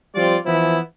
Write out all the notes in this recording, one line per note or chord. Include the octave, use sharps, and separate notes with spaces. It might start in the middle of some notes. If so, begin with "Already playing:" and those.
F3 G3 C4 F4 D5
E3 F3 B3 E4